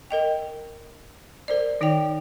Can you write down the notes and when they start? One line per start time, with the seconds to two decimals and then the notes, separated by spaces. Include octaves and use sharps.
0.11 A#4 D#5 G5
1.48 A#4 C5 D5
1.81 D#3 D#4 C#5 D5 G5